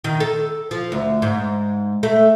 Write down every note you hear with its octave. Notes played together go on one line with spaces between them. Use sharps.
D#3
A4
F3
D2
G#2
A3